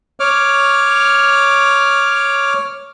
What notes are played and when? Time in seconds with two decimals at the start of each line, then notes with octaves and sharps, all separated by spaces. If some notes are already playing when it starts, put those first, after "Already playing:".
0.20 C#5 D6 F6